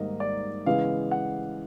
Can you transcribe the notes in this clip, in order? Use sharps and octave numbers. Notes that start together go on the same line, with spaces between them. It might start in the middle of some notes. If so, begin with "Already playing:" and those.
Already playing: G#2 D#3 G3 A#3 D#5
D5
C#3 E3 G#3 B3 F5
F#5